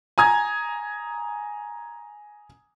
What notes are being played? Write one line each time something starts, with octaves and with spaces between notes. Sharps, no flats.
G#5 A#5 D#6 G#6